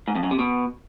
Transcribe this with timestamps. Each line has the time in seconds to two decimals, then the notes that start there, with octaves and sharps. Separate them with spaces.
0.08 G#2
0.15 F2
0.23 F#2
0.31 C3
0.39 B2